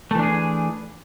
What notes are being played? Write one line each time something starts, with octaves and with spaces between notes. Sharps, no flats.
E3 A3 D4 G#4